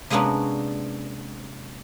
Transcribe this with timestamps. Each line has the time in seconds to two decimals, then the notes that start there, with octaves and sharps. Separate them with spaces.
0.10 C3 G#3 A#3 B3 C#4 D4